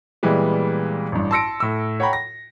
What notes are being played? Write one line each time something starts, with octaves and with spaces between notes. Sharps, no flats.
A#2 E3 G3 G#3 B3
A1 G2
A5 C6 E6 A#6 C#7 D7
A2 E6
C#5 F#5 G5 A#5 B5
A#6